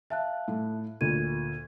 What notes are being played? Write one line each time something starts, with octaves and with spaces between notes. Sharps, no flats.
E5 F5 A5 F#6
A2
D2 A#2 G#6 D#7